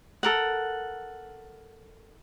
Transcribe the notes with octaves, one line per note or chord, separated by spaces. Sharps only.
A4 A#4 F#5